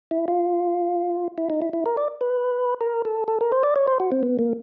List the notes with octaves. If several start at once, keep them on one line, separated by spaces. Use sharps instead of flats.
E4
F4
E4
D#4
E4
E4
A#4
D5
B4
A#4
A4
A4
A#4
C5
D5
C#5
C5
F#4
C4
B3
A#3